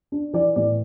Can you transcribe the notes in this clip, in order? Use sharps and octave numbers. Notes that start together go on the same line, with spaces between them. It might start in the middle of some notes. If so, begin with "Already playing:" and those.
D4
E3 D5
A2 D5